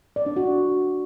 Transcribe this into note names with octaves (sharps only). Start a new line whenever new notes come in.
D5
D4
F#4